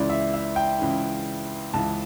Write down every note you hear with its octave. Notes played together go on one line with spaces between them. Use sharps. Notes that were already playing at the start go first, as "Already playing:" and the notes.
Already playing: C#2 C#3 E3 D5
E5
E5
G5
C#2 C#3 E3
C#2 C#3 E3 A5